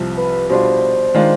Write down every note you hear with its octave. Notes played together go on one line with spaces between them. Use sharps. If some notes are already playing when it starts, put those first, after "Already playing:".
Already playing: C2 C3 F3
B4
B2 G3 D4 F4 C5
D#3 G#3 D4 F4